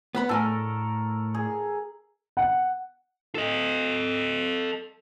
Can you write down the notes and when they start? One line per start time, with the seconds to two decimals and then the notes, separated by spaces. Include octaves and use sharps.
0.15 B3 B4 B5
0.29 A2 A4 A#4 G#5
1.34 G#4
2.37 F#5
3.35 A4 D#5